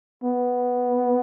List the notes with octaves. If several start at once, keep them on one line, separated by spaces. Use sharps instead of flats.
B3